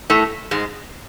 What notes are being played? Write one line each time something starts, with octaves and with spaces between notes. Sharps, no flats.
A2 A3
G#2 G#3